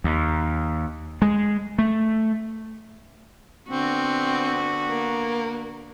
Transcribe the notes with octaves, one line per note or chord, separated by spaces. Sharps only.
D#2
G#3
A3
D3 B3 C4 F#4
A#3